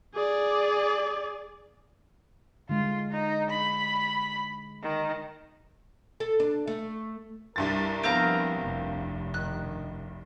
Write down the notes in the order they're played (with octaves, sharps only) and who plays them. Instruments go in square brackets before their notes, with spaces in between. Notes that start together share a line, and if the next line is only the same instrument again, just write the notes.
[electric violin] G#4 D5
[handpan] D3 G#3 [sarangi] F4
[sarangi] D#4
B5
D#3
[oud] A4
D4
A3
[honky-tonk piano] C2 G2 A6 [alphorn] A#4
[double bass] F3 B3 [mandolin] C4 F5 A#5
[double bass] F1
[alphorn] D#3 [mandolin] F#6